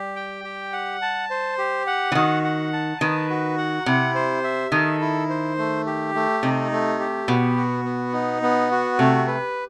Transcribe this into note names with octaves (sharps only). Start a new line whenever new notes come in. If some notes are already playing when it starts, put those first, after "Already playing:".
Already playing: G3 G4
G5
G4
F#5
A5
C5
G4
F#5
E3
D#3 F#4
F#5
A5
D#3 B4
F#4
F#5
C3 E4
C5
E5
D#3 A4
E4
C5
A3
G4
A3
C3 D#4
A3
G4
B2 B3
F#4
B3
D#4
B3
F#4
C3 A3
B4